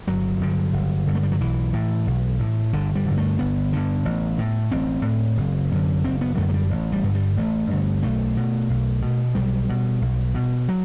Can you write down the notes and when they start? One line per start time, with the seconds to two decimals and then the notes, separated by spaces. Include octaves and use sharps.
0.07 G1 F#3
0.41 G2 D3
0.73 G1
1.07 G2 D3
1.15 A3
1.23 G3
1.32 F#3
1.40 B1 E3
1.73 A2
2.07 B1
2.39 A2
2.73 G1 D3
2.95 G3
3.06 G2 D3
3.18 A3
3.39 G1 B3
3.73 G2 D3
4.05 A1
4.38 A2
4.72 A1 C4
5.05 A2
5.37 F#1
5.72 F#2 D3
6.04 F#1 C4
6.21 B3
6.37 F#2 D3 A3
6.49 A3
6.54 G3
6.70 A1
6.92 G3
7.04 G2 D3
7.15 G3
7.37 A1 A3
7.71 G2 D3
8.03 B1 A3
8.37 B2
8.70 B1
9.02 B2
9.35 B1 G3
9.69 B2
10.01 B1
10.35 B2
10.68 F#3